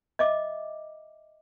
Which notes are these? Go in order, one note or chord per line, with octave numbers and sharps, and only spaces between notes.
D#5 E5 D6